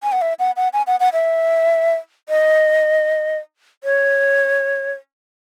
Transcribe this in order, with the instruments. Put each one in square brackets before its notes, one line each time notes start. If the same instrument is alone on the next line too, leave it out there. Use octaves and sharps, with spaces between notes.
[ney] G#5
F#5
E5
F#5
F#5
G#5
F#5
F#5
E5
D#5
C#5